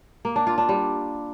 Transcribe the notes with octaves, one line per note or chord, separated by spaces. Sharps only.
A#3
D4
F4
D4
G3